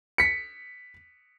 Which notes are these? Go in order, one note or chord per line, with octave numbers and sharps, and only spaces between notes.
B6 C#7